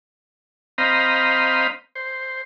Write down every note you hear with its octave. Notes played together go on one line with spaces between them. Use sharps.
C4 C5 D#5 F5 A#5 B5
C5